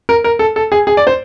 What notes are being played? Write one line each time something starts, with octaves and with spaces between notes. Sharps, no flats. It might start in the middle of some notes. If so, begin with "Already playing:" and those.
A#4
A#4
A4
A4
G#4
G#4
D5
C5